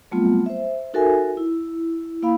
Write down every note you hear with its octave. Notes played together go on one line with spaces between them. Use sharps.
F#3 G3 A3 B3 C4 F4
C5 E5
D#4 F#4 A4 A#4 E5 G#5
E4
A#3 E4 F5 B5